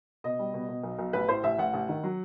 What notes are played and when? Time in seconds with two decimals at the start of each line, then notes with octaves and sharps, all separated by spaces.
0.24 B2 D#5
0.39 G3
0.54 B2
0.69 B2
0.83 B1
0.99 B1
1.13 A1 B4
1.29 A2 C5
1.44 A1 E5
1.58 A1 F#5
1.74 A1
1.89 D#3
2.04 F#3